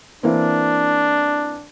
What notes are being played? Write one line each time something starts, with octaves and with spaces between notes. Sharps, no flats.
E3 A#3 C4 D4